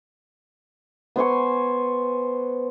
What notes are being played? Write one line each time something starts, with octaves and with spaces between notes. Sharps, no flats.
B3 C5 G#5 C#6